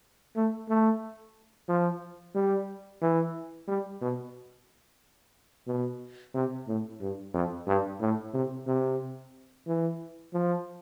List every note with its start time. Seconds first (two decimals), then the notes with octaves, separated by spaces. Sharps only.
0.36 A3
0.69 A3
1.69 F3
2.35 G3
3.02 E3
3.68 G3
4.01 B2
5.67 B2
6.34 C3
6.67 A2
7.00 G2
7.34 F2
7.67 G2
8.00 A2
8.34 C3
8.67 C3
9.67 E3
10.33 F3